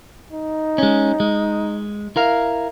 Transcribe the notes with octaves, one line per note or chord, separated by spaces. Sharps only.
D#4
G#3 C#4
G#3
E4 A#4 F5